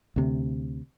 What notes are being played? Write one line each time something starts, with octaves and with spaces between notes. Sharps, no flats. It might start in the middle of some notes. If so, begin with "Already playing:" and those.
D2 C3